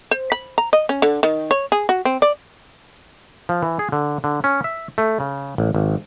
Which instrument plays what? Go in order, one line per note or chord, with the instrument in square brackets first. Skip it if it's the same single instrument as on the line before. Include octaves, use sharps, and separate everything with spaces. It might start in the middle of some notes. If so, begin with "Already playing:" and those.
[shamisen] C5
B5
A#5
D#5
C#4
D3
D#3
C#5
G#4
F#4
C4
D5
[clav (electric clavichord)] F3
E3
G#4
D3
D3
C#4
E5
A3
C#3
A1
G#1